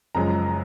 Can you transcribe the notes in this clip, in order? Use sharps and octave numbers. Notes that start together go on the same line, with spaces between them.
F#1 F#2 F3 G#3 A#5